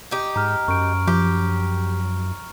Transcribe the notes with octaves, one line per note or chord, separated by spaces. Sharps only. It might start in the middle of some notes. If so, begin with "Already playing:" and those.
D#4 G4
G#2 A#5 F6
F#2 C#6 D7
F3 G4